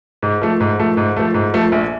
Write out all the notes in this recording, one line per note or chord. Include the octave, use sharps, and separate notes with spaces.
G#2
F3 A3
G#2
F3 A3
G#2
F3 A3
G#2
F3 A3
A#1